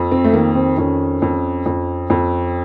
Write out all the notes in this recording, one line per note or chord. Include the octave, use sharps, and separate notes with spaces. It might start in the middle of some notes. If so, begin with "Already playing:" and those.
Already playing: F2
C4
A3
D#3 A#3
C4
F2 C#4
F2
F2
F2